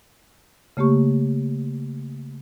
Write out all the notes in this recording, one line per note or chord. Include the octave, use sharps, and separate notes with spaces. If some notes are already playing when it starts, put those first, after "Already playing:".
C#3 A3 A#3 G4 C#6